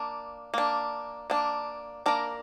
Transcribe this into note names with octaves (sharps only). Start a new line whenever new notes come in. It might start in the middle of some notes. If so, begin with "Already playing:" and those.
Already playing: A#3 D4
A#3 D4
A#3 D4
A#3 D4 A#4